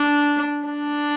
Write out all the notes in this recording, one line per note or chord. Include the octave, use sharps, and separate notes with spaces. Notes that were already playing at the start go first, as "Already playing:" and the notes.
Already playing: D4
D4